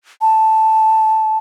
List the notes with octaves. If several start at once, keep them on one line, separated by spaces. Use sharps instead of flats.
A5